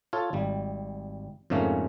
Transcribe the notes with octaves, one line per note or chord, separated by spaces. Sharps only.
F4 A4 C#5
G#1 G3
F2 G#2 C#3 A3 A#3 C#4